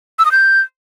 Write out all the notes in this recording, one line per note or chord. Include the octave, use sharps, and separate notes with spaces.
E6
D#6
G6